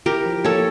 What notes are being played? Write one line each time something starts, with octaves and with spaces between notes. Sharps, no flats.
E4 G4 A#4
F3
A#3 A4 C#5